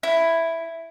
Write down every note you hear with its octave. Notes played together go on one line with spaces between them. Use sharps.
E4